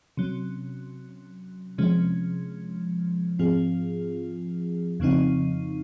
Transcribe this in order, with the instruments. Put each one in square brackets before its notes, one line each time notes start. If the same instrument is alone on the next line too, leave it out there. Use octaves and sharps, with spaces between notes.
[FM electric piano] C3 F#3 C#4
C3 F3 G#3 C#4
G#2 F3 C4 F4 G#4
F2 C#3 F3 C4 D#4